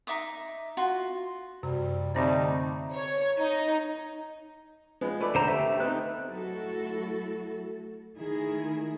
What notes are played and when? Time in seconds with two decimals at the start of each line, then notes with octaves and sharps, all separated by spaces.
0.07 D#4 E5 D6 D#6
0.77 F4 F#4
1.63 F#2 C3 G3
2.15 D3 G3 A3 C4 D#4 C5
2.94 C#5
3.40 D#4
5.01 F3 G#3 B3
5.20 A3 B4 D5
5.35 D3 C5 A#5
5.48 A3 G4 E5
5.80 B3 C4 D#4 F#6
6.27 F#3 A3 E4 F#4 A4
8.18 D#3 A3 E4 G#4